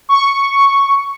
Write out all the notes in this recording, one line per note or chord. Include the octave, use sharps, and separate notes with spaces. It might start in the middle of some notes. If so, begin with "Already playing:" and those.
C#6